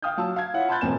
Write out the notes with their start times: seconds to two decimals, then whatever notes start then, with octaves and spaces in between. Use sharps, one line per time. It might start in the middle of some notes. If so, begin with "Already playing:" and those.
0.02 F5 G5 D#6 F6 G6
0.17 F#3 A5 E6
0.36 F5 G#6
0.54 E4 F4 C#5 F#5
0.69 A5 B5 C6 F#6 G6 A6
0.81 E1 F2 B3 C4 G#5 E7